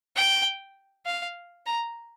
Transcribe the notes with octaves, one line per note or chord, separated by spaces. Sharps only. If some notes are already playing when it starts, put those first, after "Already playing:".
G5
F5
A#5